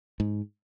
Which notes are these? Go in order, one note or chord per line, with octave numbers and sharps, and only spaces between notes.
G#2